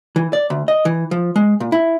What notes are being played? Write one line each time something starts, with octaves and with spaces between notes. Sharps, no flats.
E3
D5
D2
D#5
E3
F3
G#3
A#2
E4